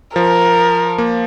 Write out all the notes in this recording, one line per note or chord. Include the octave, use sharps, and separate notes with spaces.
F3 A#4
A#3